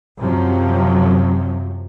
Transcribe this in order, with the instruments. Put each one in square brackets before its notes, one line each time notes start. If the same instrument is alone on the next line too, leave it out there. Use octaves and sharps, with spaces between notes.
[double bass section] F#2 C3 F3 F#3